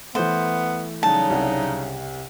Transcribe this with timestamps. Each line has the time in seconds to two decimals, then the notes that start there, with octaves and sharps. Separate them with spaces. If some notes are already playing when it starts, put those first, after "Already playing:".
0.15 E3 A3 B3 C5
1.03 C#3 F#3 G3 D#4 A5
1.30 C2 C3